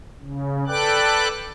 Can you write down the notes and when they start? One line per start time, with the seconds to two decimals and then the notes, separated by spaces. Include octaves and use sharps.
0.20 C#3
0.68 A4 B4 D5 G5 D6 F#6